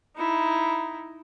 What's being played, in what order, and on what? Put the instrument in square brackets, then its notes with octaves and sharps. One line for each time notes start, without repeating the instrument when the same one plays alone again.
[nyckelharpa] D#4 E4